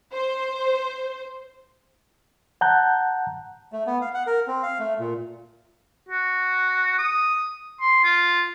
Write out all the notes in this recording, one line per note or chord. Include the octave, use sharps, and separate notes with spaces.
C5
F#5 A5 A#5 F#6 G6
A3
B3
F5
F#5
A#4
C4
F5
A3
A#2
F#4
D#6
C6
F4